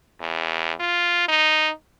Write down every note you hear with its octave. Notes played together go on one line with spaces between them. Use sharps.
E2
F4
D#4